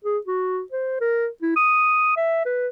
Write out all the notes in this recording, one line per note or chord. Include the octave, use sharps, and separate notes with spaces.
G#4
F#4
C5
A#4
E4
D#6
E5
B4